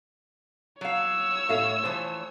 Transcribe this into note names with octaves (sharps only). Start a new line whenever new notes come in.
F#3 C#5 F5 E6
A2 E5 F5
E3 F3 A3 C5